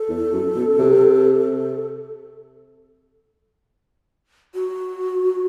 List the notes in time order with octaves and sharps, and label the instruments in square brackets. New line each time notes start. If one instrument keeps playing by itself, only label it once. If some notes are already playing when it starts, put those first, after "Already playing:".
Already playing: [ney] A4
[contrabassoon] E2
F#2
B2
C3
[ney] F#4